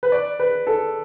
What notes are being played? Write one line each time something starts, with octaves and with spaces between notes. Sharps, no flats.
B4
D5
B4
A4